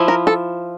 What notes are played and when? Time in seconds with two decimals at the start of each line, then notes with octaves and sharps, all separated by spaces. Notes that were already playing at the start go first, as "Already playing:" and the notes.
Already playing: F3 E4
0.08 A#4
0.27 A4